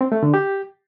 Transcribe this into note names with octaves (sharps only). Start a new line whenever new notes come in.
C4
A3
D3
G4